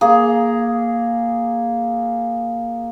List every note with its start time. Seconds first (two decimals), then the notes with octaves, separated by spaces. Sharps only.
0.01 A#3 G#4